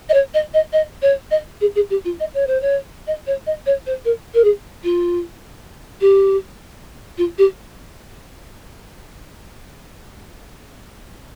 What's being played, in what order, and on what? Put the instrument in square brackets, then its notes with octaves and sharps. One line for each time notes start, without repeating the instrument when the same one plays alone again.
[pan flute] D#5
C#5
D#5
D#5
D#5
C#5
D#5
G#4
G#4
G4
F4
D#5
C#5
C5
C#5
D#5
C#5
D#5
C#5
C5
A#4
A#4
G#4
F4
G4
F4
G4